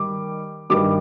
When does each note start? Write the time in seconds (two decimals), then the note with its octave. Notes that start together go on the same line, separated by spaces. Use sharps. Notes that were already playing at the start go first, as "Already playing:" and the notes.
Already playing: D#3 G3 D6
0.70 G2 D#3 G3 D6